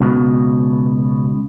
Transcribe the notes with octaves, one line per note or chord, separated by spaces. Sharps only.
C#2 B2